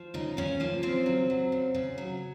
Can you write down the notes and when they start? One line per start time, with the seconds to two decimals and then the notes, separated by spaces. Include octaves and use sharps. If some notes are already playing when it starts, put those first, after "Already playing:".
Already playing: F3
0.14 C#3 D#4
0.37 C#3 C#4
0.60 F3 A#3
0.83 C#3 C4
1.06 F#3
1.30 F#3
1.52 C#3
1.75 C#3
1.98 F#3